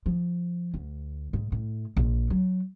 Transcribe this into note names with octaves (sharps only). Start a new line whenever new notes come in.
F3
D2
G#2
A2
A#1
F#3